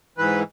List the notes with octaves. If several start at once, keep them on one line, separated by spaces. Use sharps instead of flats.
G#2 E3 B4